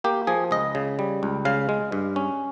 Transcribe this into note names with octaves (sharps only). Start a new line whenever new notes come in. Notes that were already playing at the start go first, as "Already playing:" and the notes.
A#3 G4
F3 G#4
C#2 D#5
C#3
G3
C#2
C#3 F5
G#3
G2
C#4